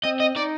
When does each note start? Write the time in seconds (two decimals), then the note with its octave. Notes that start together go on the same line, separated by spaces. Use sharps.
0.04 C4 D#5
0.20 D#5
0.35 D#4 D5